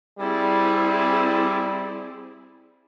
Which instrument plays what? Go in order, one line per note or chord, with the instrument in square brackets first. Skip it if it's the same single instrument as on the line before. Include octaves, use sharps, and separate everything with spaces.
[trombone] G3 [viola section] C4 E4 G#4